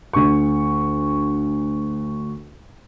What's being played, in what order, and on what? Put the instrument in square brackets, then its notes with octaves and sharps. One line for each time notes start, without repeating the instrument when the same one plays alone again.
[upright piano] D2 C#6